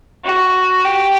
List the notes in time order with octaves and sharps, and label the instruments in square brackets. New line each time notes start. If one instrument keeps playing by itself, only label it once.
[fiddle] F#4
G4